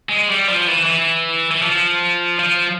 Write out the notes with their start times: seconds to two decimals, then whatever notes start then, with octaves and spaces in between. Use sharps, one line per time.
0.09 G#3
0.29 G3
0.48 F3
0.67 E3
0.86 E3
1.51 E3
1.62 F3
2.39 F3